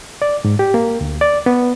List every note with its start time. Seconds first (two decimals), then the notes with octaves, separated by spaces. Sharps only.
0.22 D5
0.45 G#2
0.59 G4
0.74 A#3
1.01 D2
1.21 D5
1.46 B3